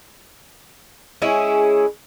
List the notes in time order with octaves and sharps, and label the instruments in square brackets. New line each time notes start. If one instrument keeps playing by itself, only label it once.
[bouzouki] G#3 C#4 E4 G#4